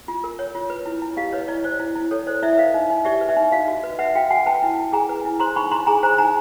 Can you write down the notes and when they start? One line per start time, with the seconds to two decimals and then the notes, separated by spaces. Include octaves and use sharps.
0.08 F4
0.24 A#4
0.39 C#5
0.55 F4
0.70 B4
0.86 E4
1.02 E4
1.17 G4 D#5 F5
1.33 B4 C#5 D#5
1.48 E4 D5
1.64 C5 D5
1.80 E4
1.95 E4
2.11 A4 C#5
2.27 C5 D5
2.42 E4 D5 E5
2.53 E5
2.58 B4 D#5 F5
2.74 D#4
2.90 D#4
3.05 G4 D5 E5
3.21 B4
3.29 D5 E5
3.36 D#4
3.52 F#4 D#5 F5
3.68 F#4
3.83 B4
3.99 B4 E5 F#5
4.15 F#4 F5 G5
4.31 F#4 F#5 G#5
4.46 B4 G5 A5
4.62 E4
4.78 E4
4.93 G#4 G#5 A#5
5.09 B4
5.25 E4
5.40 C5 A#5 C6
5.56 D#4 B5 C#6
5.71 D#4 A#5 C6
5.87 G#4 G#5 A#5
6.03 C5 G#5 A#5
6.18 D#4 G#5 A#5